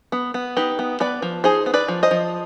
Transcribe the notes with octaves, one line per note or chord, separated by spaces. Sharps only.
B3
B3
D#4 G4 B4
B3
B3 B4 D5
F3
D#4 G#4 C5
B3
B4 D5
F3
C5 D#5
F3